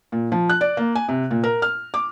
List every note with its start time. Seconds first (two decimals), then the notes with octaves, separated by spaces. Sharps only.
0.12 A#2
0.32 F3
0.50 F#6
0.61 D5
0.77 A#3
0.95 G#5
1.09 C3
1.31 A#2
1.44 A#4
1.62 F6
1.94 D6